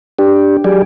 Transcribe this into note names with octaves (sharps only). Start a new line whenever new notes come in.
D4 G4
F#3 G4 G#4 D5